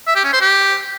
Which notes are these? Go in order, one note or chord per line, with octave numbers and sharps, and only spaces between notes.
E5
G4
C#4
C5
G4